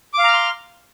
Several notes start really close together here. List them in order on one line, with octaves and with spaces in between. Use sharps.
D6 F5 A#5 F6 C6